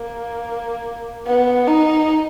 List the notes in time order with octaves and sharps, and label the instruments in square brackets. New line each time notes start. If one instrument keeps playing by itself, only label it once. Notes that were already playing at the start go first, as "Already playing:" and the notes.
Already playing: [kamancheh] A#3
B3
D#4